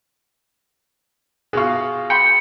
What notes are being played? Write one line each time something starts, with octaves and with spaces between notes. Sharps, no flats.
B2 F4 G#4 C#6
G5 B5 C6 C#7